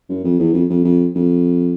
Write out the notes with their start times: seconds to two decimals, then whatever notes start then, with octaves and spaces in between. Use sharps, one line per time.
0.09 F#2
0.24 F2
0.39 E2
0.54 F2
0.70 F2
0.84 F2
1.15 F2